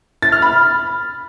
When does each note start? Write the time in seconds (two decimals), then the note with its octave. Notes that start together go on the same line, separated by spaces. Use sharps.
0.22 A6
0.32 F6
0.42 B5